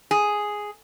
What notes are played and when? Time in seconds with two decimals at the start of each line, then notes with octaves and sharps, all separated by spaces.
0.11 G#4